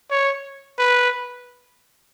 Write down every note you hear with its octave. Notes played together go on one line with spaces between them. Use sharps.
C#5
B4